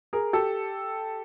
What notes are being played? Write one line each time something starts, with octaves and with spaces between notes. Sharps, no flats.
G#4 A#4
G4 A4